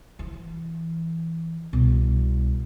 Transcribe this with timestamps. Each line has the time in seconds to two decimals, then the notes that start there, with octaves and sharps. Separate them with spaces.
0.19 E3
1.73 C2 B2